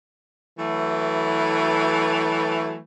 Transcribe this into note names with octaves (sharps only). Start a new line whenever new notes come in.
E3 F#3 A3